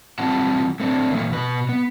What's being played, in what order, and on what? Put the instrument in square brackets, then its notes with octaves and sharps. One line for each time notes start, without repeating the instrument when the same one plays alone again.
[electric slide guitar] E3 G3 C4 F4 F#5 A5
A3 C4 D4
A#2 E3 A3 A#3
B2 B4
B3